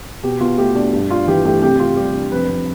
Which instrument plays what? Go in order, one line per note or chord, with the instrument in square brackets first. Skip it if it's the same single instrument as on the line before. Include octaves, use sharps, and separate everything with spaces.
[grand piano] B2 G4
B2 F4
A3 G4
D4
G2
D4 F4
E3 G4
A3 G4
C3 G4
C3 F4
G3 G4
D4
F2 B4
F2